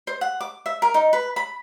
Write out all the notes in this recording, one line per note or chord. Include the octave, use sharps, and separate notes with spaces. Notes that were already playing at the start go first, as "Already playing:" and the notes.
C5
F#5
D6
E5
A#4
D#4
B4
B5